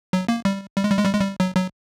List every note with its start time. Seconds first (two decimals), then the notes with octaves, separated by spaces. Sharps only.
0.13 F#3
0.28 A#3
0.45 G3
0.76 G3
0.84 G#3
0.91 G3
0.99 G#3
1.05 G3
1.13 G#3
1.20 G3
1.40 F#3
1.56 F#3